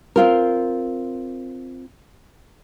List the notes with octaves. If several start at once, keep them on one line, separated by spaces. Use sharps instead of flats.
C4 F4 A#4